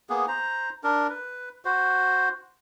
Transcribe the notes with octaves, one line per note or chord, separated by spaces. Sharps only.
A#3 B3 G#4
C5 A#5
D4 A#4
B4
F#4 C5